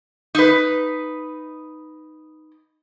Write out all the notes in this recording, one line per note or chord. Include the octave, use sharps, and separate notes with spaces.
D#4 B4